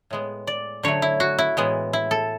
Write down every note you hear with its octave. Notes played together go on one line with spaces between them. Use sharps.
A2 G#3 B3
D5
D3 F#3 A3 C#5
E4
F#4
E4
A2 E3 G#3 B3
E4
A4